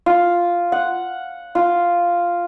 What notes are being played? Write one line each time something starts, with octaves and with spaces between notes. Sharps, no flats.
F4
F#5
F4